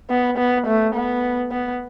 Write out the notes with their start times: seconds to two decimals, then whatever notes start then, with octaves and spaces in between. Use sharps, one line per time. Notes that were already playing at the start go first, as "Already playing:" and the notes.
0.10 B3
0.38 B3
0.66 A3
0.94 B3
1.51 B3